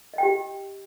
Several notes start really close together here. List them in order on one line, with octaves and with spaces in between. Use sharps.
D#5 G5 G4